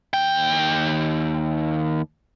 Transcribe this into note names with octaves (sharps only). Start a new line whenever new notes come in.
D#2 G5